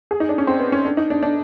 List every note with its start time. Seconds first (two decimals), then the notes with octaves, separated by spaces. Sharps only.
0.11 G#4
0.20 D#4
0.29 D4
0.38 C#4
0.47 C4
0.59 B3
0.72 C#4
0.85 D4
0.97 D#4
1.10 D4
1.23 D4